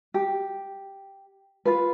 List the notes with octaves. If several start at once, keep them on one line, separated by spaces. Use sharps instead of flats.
G4
F4 B4